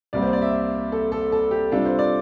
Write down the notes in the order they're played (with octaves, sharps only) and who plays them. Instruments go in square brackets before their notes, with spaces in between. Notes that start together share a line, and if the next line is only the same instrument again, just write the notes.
[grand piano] C2 C3 G3 A#3 D5
C5
D5
E5
A4
A4
A4
G4
C3 G3 D4 F4 A4
C5
D5